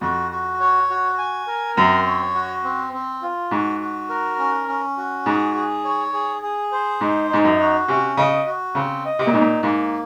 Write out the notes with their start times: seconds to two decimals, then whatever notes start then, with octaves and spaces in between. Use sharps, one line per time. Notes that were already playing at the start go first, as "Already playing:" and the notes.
0.01 F2 F#4
0.31 F#4
0.60 C#5
0.90 F#4
1.18 G#5
1.47 A#4
1.77 F#2 C4
2.06 C#5
2.35 F#4
2.64 C4
2.93 C4
3.22 F4
3.51 G#2 F#4
3.80 F#4
4.09 A#4
4.39 C#4
4.68 C#4
4.97 F#4
5.25 G#2 G#4
5.55 G#4
5.85 C#5
6.13 G#4
6.42 G#4
6.72 C5
7.01 G#2 D#4
7.30 G#2 D#4
7.44 F#2
7.59 F#4
7.88 C3 C#4
8.17 C#3 D#5
8.46 F#4
8.75 C#3 C4
9.05 D#5
9.19 C3
9.27 A#2
9.33 G#2 D#4
9.41 A#2
9.63 G#2 A#3